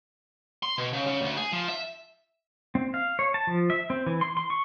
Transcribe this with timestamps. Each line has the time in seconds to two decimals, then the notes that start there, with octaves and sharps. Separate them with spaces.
0.63 C6
0.78 B2
0.93 C#3
1.06 C#3
1.22 D2
1.37 G#4
1.52 F3
1.68 E5
2.75 C4
2.94 F5
3.19 C#5
3.34 A5
3.47 F3
3.70 E5
3.90 C4
4.06 E3
4.21 C6
4.37 C6
4.50 C#6